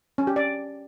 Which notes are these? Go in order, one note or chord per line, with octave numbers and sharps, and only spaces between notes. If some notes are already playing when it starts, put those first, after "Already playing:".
C#4
G4
D5